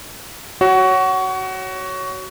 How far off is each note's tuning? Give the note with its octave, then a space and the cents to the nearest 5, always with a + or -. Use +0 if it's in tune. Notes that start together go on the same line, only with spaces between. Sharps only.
F#4 +20 C#5 +0